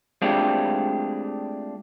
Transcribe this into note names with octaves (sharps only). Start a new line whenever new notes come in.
G#3 A3 C4 D4 F4 G4